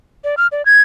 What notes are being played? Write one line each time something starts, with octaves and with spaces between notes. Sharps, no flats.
D5
F6
D5
G#6